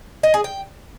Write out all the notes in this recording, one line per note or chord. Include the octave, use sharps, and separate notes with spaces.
D#5
G#4
G5